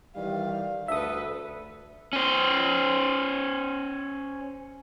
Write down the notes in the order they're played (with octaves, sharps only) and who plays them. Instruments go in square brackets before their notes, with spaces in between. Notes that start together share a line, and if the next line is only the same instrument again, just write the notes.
[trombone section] D#3 E3 G3 [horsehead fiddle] F5
[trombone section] D2 [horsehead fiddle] A4 B4 [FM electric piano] E5 D#6
[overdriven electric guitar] C#4 C5